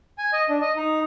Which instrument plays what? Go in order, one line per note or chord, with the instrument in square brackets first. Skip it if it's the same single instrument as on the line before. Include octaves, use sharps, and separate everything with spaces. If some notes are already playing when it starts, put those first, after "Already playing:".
[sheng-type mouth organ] G#5
D#5
D4
D#5
D#4